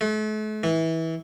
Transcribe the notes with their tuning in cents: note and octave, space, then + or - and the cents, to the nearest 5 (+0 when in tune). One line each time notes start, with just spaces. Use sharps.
A3 -40
E3 -20